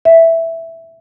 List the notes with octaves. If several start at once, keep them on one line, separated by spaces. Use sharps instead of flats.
E5